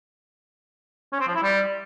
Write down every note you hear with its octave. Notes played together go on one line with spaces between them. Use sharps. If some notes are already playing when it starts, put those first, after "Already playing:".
C#4
C4
F3
E4
G3